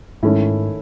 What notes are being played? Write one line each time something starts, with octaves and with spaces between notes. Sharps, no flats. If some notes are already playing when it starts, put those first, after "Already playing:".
G#2 D#3 A3 C#4 E4